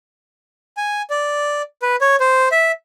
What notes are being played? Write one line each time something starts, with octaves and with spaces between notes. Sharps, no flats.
G#5
D5
B4
C#5
C5
E5